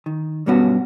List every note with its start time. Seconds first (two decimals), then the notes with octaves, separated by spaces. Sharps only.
0.06 D#3
0.46 B1 G2 G3 B3 C#4 F#4